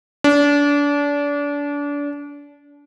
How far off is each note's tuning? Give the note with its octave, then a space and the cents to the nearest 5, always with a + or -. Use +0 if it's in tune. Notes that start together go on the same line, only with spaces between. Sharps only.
D4 -30